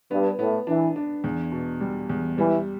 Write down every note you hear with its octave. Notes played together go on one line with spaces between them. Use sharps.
G2 B3
A2 B3
E3 D4
D4
E2
B2
G3
E2
E3 G3